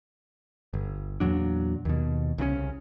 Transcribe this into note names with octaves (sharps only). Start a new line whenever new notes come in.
G1
E2 A#2 F#3 D4
D#2 B2
C2 C#3 E3 C#4